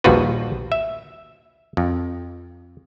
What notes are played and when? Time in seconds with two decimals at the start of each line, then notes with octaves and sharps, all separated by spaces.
0.04 A#1 D#2 G3 F4 F#4 B4
0.72 E5
1.77 F2